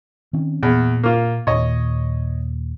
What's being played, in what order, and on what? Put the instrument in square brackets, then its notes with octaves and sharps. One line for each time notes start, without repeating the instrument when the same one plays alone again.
[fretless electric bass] D#3 C4 C#4
[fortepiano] E2 [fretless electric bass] A#2
[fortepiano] A#3 F4
[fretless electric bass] D#2 A#2 [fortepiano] C#5 D#5